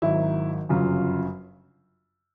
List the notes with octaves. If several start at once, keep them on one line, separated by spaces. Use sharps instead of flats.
G#1 G#2 D#3 F#3 E4
G1 F#2 C#3 F#3 F4